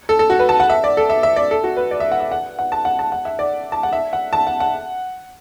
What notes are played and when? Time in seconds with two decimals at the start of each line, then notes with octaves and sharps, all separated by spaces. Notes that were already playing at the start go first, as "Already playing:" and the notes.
0.09 A4
0.19 A4
0.30 F#4
0.39 B4
0.49 A5
0.60 F#5
0.70 E5
0.84 D5
0.97 A4
1.10 E5
1.23 E5
1.36 D5
1.51 A4
1.64 F#4
1.77 B4
1.91 D5
2.00 E5
2.12 F#5
2.20 E5
2.31 F#5
2.59 F#5
2.72 A5
2.85 F#5
2.99 A5
3.12 F#5
3.25 E5
3.39 D5
3.72 A5
3.83 F#5
3.93 E5
4.13 F#5
4.33 A5
4.47 F#5
4.60 F#5